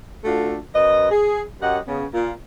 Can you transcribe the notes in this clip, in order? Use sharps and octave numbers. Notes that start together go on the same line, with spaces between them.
A3 D4 F4 F#4 A4
F#2 B4 D#5
G#4
F#2 G4 D#5 F#5
C#3 B3
A#2 F4